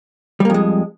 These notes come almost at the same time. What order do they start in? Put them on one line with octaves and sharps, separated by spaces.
G3 A#3 F2 G#3